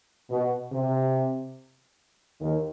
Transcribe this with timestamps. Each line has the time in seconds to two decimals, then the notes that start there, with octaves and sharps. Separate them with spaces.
0.31 B2
0.72 C3
2.41 D#2 D#3